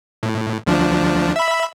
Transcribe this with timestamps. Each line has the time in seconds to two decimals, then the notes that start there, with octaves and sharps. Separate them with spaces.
0.23 A2
0.66 D2 F3 D4
1.36 E5 B5